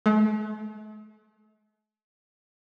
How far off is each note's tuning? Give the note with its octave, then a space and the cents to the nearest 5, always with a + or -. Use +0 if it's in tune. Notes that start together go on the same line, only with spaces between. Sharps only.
A3 -45